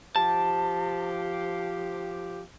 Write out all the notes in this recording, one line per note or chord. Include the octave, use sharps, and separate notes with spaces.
F3 G4 A5